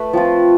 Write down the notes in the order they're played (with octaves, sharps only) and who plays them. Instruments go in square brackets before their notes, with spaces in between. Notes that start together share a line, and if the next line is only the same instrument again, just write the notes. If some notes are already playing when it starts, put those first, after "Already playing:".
Already playing: [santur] A3 B4
F3 C4 F4